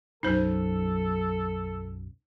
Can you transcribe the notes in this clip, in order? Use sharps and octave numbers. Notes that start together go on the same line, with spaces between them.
B1 F#2 D#4 A4 C5